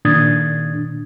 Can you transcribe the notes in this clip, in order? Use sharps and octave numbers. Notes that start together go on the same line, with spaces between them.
A#2 D#3 D4 D#6 G#6 A6